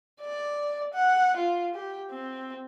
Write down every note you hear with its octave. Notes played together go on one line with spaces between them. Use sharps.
D5
F#5
F4
G4
C4